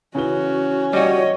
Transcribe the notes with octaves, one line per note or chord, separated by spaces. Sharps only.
C#3 E3 C#4 F#4 G7
G3 F#4 C#5 D#5